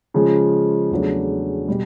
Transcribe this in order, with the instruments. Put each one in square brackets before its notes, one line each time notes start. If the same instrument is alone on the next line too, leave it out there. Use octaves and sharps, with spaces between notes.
[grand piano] C#3 F3 G#3
E2 C#3 F#3 A3 D4
B2 G3